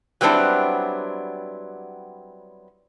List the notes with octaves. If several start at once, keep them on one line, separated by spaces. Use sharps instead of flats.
F#3 G3 B3 C4 D4 E4